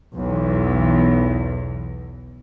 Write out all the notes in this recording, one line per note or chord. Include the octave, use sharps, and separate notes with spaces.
B1 E2